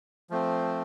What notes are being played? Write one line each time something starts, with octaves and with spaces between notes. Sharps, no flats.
F3 A3 C4